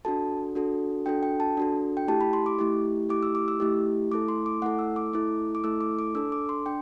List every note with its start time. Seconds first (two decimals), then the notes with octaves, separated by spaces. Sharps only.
0.05 D4 F#4 A4 A5
0.55 D4 F#4 A4
1.06 D4 F#4 A4 G5
1.23 G5
1.40 A5
1.57 D4 F#4 A4
1.97 G5
2.08 A3 E4 G4 A5
2.21 B5
2.33 C6
2.46 D6
2.59 A3 E4 G4
3.09 A3 E4 G4 D6
3.23 E6
3.35 D6
3.48 E6
3.60 A3 E4 G4
4.11 A3 E4 A4 D6
4.28 C6
4.46 D6
4.62 A3 E4 A4 F#5
4.79 E6
4.96 D6
5.13 A3 E4 A4 D6
5.55 D6
5.64 A3 E4 A4 E6
5.81 D6
5.99 D6
6.15 D4 A4 E6
6.32 D6
6.49 C6
6.66 D4 G5